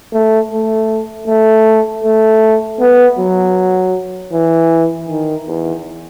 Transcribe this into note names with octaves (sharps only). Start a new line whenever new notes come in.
A3
A3
A3
A3
B3
F#3
E3
D#3
E2